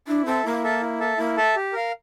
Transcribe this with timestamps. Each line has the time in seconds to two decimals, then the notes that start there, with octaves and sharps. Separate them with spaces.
0.08 D4 E4
0.26 C4 A4 E5 A5
0.44 A#3 E4
0.64 A4 E5 A5
0.81 E4
1.00 A4 E5 A5
1.18 A#3 E4
1.37 A4 E5 A5
1.56 G4
1.73 A#4 F5